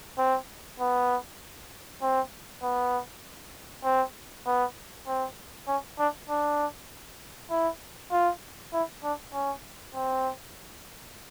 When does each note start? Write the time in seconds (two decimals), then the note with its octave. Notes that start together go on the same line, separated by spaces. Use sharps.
0.18 C4
0.80 B3
2.02 C4
2.63 B3
3.84 C4
4.46 B3
5.07 C4
5.68 C#4
5.99 D4
6.29 D4
7.50 E4
8.12 F4
8.73 E4
9.04 D4
9.33 C#4
9.94 C4